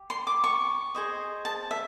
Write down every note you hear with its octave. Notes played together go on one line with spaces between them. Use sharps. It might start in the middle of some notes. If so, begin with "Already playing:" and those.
Already playing: G4
C6
D6
C#6
G#4 C5 D#5
A5
E5